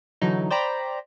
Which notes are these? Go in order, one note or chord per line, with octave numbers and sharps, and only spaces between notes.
D3 E3 F#3 D#4
C5 D5 G5 A#5 B5